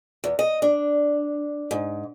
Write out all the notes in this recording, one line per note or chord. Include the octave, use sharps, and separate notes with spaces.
E2
D#5
D4
G#2